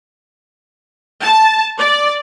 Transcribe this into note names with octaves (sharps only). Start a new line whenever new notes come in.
A5
D5